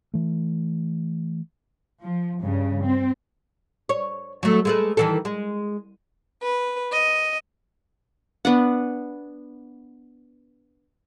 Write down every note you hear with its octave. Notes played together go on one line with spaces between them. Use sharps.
E3 A3
F3
G2 C#3
C4
C#5
F#3 A3
G#3 A3 B4
D#3 E3 A4
G#3
B4
D#5
B3 D4 F#5